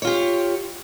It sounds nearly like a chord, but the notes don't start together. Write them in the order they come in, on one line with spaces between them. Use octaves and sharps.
C#5 F4 G4